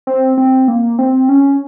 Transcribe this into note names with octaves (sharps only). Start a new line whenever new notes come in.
C4
C4
A#3
C4
C#4